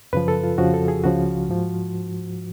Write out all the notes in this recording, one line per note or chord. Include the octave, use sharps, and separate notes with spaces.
F#2 C#3 F3 B4
A4
F4
F2 C#3 F3 F#4
A4
G#4
C#2 C#3 F3 F#4
G#2 F3